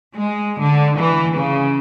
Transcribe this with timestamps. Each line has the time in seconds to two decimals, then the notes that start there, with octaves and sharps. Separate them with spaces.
0.15 G#3
0.60 D3
0.98 E3
1.35 C#3